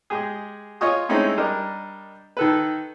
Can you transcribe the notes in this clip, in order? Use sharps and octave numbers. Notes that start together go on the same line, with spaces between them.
G#3 G4 G#4
F4 C#5 D#5 G#5 C#6 D#6
G#3 A3 C4 C#4 D#4 E4
G3 D4 A#4 D#5
D#3 A4 B4